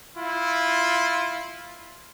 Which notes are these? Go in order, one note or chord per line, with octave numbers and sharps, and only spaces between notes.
E4 F4